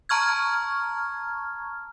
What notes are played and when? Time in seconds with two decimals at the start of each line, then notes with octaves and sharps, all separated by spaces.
0.09 A5 A#5 C#6 F6 G#6